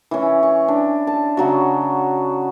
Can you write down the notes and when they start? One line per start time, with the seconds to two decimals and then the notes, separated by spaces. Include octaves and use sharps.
0.11 E3 C#4
0.43 C#6
0.68 D4
1.07 A5
1.37 C#3 F#3 F#4